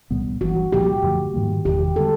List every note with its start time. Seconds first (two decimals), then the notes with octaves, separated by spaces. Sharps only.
0.11 C2 A#2 G3 B3
0.41 G1 G2 E3 F#4
0.72 C2 A#2 F3 A#3 G4
1.03 F#2 D3 F3 A3
1.34 G#2 D#3 G3 A#3
1.65 F#1 E2 C3 D#3 G4
1.96 D3 G3 B3 A4